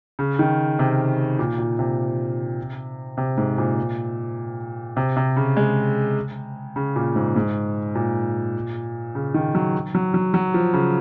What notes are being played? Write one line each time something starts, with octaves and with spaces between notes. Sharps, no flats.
C#3
D#3
C3
A#2
A#2
C3
C3
G#2
A#2
C3
C3
C#3
G#3
C#3
A#2
G#2
G#2
A#2
C#3
D#3
F#3
F#3
F#3
F#3
F3
C#3